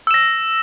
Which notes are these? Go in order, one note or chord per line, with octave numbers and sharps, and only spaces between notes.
E6 A#6 E7